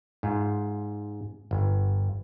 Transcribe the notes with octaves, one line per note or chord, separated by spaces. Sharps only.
G#2 F4
G1